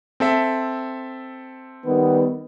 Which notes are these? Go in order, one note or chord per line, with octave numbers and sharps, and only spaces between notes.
C4 A4 E5
D#3 G3 B3